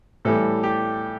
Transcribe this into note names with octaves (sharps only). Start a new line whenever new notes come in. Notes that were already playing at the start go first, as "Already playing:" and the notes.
A2 E3 G3 A4
G4